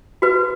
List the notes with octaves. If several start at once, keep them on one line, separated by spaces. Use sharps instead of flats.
F#4 B4